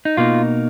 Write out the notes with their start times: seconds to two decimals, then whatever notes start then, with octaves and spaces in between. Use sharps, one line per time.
0.05 D#4
0.17 B2 A#3 D#4 F4